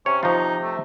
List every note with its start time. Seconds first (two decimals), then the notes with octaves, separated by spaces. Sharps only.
0.06 C3 C#4 C#5
0.23 F3 D#4 F4
0.63 A3